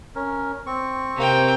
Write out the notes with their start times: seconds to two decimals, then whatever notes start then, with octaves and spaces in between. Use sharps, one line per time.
0.16 C#4 A#4
0.66 C4 C#6
1.16 C3 A#3 G5